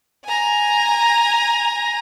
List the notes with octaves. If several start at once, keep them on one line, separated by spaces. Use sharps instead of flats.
G#5 A#5